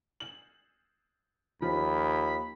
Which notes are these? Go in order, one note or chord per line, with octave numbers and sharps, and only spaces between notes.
F#7
D#2 F3 B5